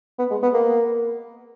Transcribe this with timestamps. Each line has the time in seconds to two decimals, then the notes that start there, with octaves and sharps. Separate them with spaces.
0.19 B3
0.31 G#3
0.42 B3
0.54 A#3